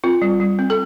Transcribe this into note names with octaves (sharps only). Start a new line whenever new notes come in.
C4 F4
G3
G3
C4
A4